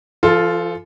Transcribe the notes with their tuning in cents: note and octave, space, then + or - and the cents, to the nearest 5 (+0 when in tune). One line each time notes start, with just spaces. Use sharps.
F3 -45 F4 +0 A4 +0